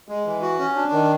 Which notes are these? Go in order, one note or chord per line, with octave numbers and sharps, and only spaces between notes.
G#3
E3
F#4
C#4
D4
D#3